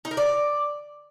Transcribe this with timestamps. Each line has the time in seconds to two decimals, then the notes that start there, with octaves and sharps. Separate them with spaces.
0.05 D#4
0.11 A#4
0.17 D5